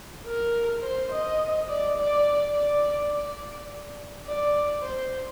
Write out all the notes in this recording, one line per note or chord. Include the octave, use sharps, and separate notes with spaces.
A#4
C5
D#5
D5
D5
D5
D5
D5
C5